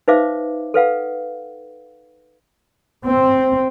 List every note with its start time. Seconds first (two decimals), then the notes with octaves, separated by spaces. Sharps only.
0.08 D#4 B4 C5 E5 F5 D6
0.74 A4 B4 F5 F#5
3.05 C4